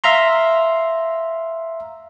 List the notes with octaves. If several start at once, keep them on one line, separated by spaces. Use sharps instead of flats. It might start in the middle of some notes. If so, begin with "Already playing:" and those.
E5 F5 A#5 C6